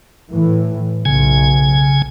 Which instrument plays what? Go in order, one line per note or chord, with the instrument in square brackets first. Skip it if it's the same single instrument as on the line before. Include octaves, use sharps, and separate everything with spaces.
[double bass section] A2 E3
[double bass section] B1 [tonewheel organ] C#3 G#5